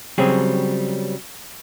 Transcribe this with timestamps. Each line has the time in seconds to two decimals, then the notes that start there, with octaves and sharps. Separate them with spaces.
0.18 C#3 F#3 G3 C4 G#4